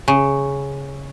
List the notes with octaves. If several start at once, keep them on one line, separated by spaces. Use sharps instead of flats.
C#3